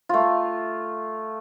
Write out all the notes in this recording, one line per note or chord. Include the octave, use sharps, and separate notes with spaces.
A3 F4